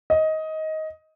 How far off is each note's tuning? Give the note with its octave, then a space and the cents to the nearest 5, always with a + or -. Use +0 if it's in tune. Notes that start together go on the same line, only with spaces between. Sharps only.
D#5 +15